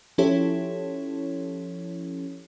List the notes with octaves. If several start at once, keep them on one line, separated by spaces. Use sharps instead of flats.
F3 C#4 E4 G4 A4 C#5